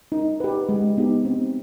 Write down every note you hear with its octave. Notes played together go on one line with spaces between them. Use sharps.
D#4
G4 B4
G#3
B3 D#4 G4
C4